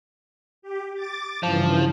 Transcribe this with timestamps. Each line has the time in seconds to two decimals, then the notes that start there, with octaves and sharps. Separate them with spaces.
0.62 G4
0.94 D6 A6
1.43 G2 C#3 E3 F3